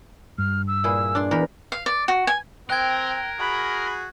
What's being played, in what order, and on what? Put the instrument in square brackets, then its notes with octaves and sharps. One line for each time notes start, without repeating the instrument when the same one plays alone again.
[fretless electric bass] G2 [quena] F6
[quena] E6
[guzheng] A#2 E4 G#4
D4 D5 C6
E2 A#4 B5
[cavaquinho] F5
D5
F#4
G#5
[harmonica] C4 [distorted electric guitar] A#4 [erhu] G5 [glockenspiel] F#6 G#6
[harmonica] F#4 G#4 [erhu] B5